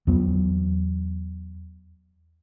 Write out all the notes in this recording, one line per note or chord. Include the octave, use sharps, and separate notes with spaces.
E2 F#3 B3